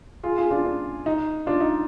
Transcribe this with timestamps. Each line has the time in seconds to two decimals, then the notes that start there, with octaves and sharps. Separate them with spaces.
0.23 F4 G#4
0.38 F4 G#4
0.50 D4 F4
0.65 D4
1.06 D#4
1.46 D4 F4
1.60 D#4